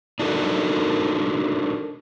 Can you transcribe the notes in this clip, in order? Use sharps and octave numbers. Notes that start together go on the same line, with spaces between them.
D4 D#4 F#4 A4 A#4